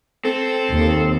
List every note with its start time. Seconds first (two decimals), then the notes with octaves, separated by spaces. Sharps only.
0.25 C4 A4
0.71 D#2